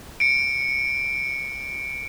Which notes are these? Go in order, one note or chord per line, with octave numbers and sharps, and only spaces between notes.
C#7 D7